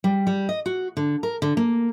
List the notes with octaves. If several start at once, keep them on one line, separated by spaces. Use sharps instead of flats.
G3
G3
D#5
F#4
D3
A#4
D3
A#3